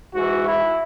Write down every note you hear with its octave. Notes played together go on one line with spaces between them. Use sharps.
G#2 E3 F#4
E4